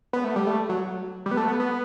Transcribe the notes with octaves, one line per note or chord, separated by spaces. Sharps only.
B3
A3
G3
A3
F#3
G3
B3
A3
B3
B3